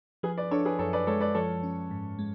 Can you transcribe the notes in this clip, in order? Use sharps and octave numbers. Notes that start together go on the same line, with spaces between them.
F3 G#4 B4
B4 D5
D4 A4 C#5
G#4 B4
F#2 A4 C#5
B4 D5
G#3 A4 C#5
B4 D5
F3 A4 C#5
C#4
G#2
G#3